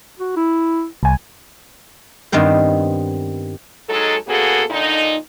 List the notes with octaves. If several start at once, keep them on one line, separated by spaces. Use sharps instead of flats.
F#4
E4
C2 G#5
G2 D#3 B3 C4 C5
F#3 G#3 D#4 G#4 A4
C#3 A#3 B3 F#4 G#4 A4
A#2 D3 D4 D#4